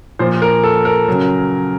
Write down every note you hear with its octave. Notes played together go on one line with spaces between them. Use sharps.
A#2 F3 C5
A#4
A4
A#4
C#3 F#3